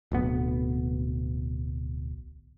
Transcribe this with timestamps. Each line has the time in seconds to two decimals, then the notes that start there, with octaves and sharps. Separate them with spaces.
0.12 D1 B1 B3